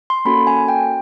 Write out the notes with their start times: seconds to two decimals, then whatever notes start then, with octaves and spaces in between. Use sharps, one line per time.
0.10 C6
0.25 A#3 C#4 F#4 A4 B5
0.47 G#5
0.68 G5